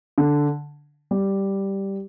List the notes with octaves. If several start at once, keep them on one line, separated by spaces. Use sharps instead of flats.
D3
G3